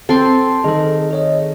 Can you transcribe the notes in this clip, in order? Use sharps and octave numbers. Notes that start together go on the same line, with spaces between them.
C4 A4 C6
D#3 G#4 A4
G#4 C#5 D#5